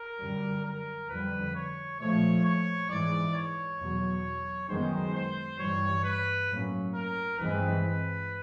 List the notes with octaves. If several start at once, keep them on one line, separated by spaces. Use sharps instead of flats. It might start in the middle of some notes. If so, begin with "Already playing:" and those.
Already playing: A#4
F#2 D3 G3
A#4
F2 D3 G3 B4
C#5
A#2 F3 A3 C#5
C#5
G#2 E3 G#3 D5
C#5
E2 B2 F#3
F#2 D#3 G#3 B3 C5
C5
G2 E3 G3 C#5
B4
A2 F#3 A#3 C#4
A#4
G2 E3 G#3 C4 B4